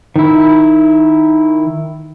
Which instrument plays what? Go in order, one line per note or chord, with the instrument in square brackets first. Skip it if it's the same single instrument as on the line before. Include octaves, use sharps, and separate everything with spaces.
[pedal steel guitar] D#3 E4